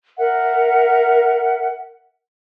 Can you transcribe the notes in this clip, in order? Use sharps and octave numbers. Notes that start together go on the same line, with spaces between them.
A#4 E5 F#5